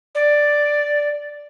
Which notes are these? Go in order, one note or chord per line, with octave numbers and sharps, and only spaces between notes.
D5